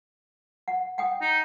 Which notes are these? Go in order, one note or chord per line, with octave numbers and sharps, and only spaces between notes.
F#5
F#5 G5 D#6
D#4